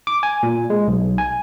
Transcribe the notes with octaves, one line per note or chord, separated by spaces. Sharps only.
D6
G#5
A#2
G#3
B1
G#5